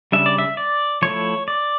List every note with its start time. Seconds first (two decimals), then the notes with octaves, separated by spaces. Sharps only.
0.12 C#3 G3 D4 E5
0.26 D5
0.39 E5
0.57 D5
1.02 F3 A3 E4 C#5
1.48 D5